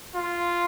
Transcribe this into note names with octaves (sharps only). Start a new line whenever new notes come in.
F4